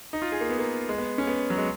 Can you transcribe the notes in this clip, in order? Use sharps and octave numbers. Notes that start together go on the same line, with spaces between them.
D#4
F4
G#4
A#3
B3
A#3
G#3
B3
C#4
B3
F#3
G#3